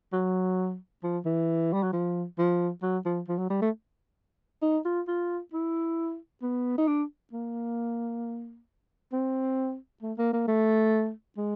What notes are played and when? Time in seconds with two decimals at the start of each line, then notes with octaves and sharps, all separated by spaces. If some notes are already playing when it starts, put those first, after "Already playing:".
0.13 F#3
1.03 F3
1.25 E3
1.73 G3
1.83 F#3
1.93 F3
2.39 F3
2.83 F#3
3.06 F3
3.28 F3
3.39 F#3
3.50 G3
3.62 A3
4.62 D#4
4.85 F4
5.08 F4
5.54 E4
6.42 B3
6.78 D#4
6.87 D4
7.33 A#3
9.13 C4
10.03 A3
10.18 A#3
10.33 A#3
10.48 A3
11.37 G#3